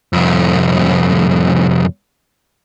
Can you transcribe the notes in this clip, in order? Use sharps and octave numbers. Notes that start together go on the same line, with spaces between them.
C2 F2